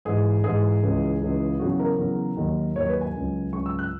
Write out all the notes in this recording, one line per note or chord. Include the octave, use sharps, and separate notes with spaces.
G#2 E3 G#4
G#2 E3 G#4
C#2 C#3 E3
C#2 C#3 E3
E2 C#3 F#3 F#4
A#4
E2 C#3 F#3
D#2 D#3 F#3
D#2 D#3 F#3 C#5
B4
G#5
C#2 C#3 F#3
C#2 C#3 F#3 C#6
E6
F#6